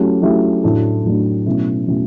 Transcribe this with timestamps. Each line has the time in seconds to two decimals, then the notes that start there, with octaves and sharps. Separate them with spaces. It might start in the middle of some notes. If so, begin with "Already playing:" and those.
Already playing: F#3 A3 C#4 E4 G4
0.22 F#3 A3 C#4 E4 G4
0.63 A2 F#3 A3 D4
1.05 A2 F#3 A3 D4
1.46 B2 F#3 A3 C#4 E4
1.88 B2 F#3 A3 C#4 E4